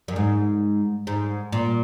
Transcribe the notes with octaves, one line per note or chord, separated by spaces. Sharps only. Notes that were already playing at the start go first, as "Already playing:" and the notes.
F#2
G#2
G#2
A#2